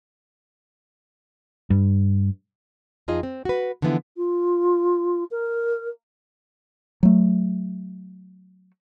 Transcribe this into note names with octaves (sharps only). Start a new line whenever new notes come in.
G2
F2 D#4 F4 G#4 D#5
C4
F#4 B4
D3 E3 F3 B3 E4
F4
A#4
F#3 A3